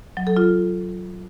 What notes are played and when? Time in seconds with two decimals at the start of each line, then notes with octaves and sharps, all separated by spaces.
0.17 F#3
0.27 A4
0.37 F4